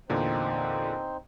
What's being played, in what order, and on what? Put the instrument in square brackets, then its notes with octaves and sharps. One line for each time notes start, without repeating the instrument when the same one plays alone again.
[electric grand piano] E2 A#2 D3 [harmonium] C4 D#4 C5